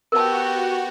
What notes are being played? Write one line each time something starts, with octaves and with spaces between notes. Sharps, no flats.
B3 F#4 G4 A#4 A5